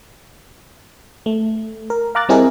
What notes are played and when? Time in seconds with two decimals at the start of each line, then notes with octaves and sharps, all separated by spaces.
1.26 A3
1.90 A#4
2.15 F5 A#5 D6 F#6 A6
2.29 G3 C4 E4 G#4 A#4 D#5